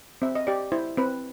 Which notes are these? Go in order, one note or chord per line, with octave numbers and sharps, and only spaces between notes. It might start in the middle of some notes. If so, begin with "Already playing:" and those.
C4 E5
D#5
G4 D5
E4 C5
C4 B4